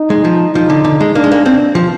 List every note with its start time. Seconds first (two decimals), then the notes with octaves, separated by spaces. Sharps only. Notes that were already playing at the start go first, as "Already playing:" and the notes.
Already playing: D#4
0.10 G#3
0.24 F3
0.55 F3 D#4
0.70 D3
0.84 D3
1.00 G#3
1.15 A#3 D4
1.24 G#3
1.32 A#3
1.46 C4 D4
1.75 F3